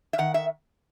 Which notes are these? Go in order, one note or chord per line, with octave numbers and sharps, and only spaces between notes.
E5
D#3 F#5
E5